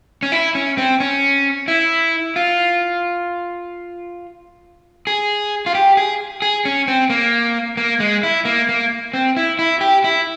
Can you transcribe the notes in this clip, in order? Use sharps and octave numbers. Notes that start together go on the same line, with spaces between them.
C#4
E4
C#4
C4
C#4
E4
F4
G#4
F4
G4
G#4
G#4
C#4
C4
A#3
A#3
G#3
E4
A#3
A#3
C4
E4
E4
G4
E4